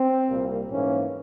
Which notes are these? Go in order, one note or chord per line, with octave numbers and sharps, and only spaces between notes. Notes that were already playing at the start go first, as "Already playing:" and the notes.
Already playing: C4
C2 A#2 G3 A#3
G#2 E3 A#3 C#4